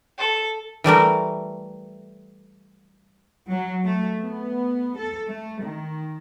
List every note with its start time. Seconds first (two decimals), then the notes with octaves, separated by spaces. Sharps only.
0.18 A4
0.84 E3 G3 A3 A#4
3.48 F#3
3.84 A3
4.21 B3
4.97 A4
5.29 A3
5.64 D#3